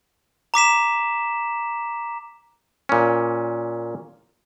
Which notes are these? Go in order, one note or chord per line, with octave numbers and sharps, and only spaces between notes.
A#5 D6 B6 E7
A#2 C#4